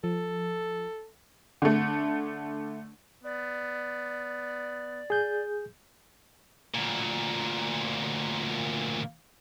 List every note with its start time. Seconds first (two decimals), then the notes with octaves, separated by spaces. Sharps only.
0.04 F3 A4
1.62 D3 A3
3.24 B3 D5
5.10 G#4 G6
6.74 D2 A#2